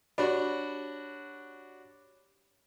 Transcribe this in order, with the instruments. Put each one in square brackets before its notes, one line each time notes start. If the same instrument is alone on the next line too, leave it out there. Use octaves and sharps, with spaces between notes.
[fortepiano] D4 F#4 [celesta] G4 C#5 B5